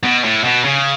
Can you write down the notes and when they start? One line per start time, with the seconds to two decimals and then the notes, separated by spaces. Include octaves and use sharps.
0.03 B2
0.24 A2
0.44 B2
0.64 C#3